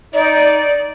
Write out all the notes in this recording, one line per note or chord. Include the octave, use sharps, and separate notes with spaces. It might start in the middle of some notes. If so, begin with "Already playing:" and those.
D#4 D5